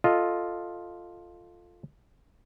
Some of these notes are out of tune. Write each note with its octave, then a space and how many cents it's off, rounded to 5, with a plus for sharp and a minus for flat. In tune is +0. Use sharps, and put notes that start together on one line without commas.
F4 +0 A4 +0 D#5 +0